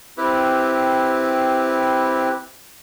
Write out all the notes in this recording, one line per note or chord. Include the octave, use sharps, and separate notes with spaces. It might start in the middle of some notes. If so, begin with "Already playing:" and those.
C4 E4 G4 B4